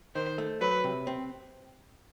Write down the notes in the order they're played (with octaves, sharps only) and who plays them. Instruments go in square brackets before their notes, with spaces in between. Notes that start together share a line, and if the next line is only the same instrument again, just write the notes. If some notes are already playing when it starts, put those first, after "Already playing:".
[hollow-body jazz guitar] D#3 [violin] C5
[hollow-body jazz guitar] A3
[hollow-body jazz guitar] F#3 [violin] B4
[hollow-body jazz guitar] C3
C4